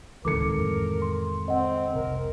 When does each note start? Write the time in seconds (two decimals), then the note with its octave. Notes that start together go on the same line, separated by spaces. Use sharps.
0.25 D1 G#1 C#2 A4 A#4 D6 C#7
0.58 F2 A2 E3
1.02 C6
1.48 C4 D#5 F#5
1.94 F1 C2 A#4